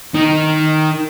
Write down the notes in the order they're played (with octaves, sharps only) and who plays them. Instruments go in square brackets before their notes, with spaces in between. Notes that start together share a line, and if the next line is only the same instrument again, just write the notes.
[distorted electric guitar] D#3